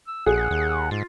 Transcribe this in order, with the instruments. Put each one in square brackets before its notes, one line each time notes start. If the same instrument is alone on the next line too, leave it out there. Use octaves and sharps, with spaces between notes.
[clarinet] E6
[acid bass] A#1 [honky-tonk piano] G#4 [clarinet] F#5
[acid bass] D#2
[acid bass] G#2 [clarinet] F4